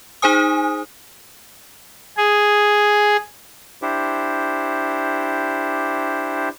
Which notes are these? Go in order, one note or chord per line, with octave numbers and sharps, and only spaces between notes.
D#4 G#4 C5 G#5 D#6
G#4
D4 E4 G4 C5